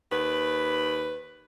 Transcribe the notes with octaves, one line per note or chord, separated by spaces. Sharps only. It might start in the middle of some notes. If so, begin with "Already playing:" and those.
D#2 B4